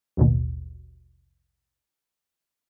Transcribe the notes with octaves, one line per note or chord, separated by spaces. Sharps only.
A1 D#2 B2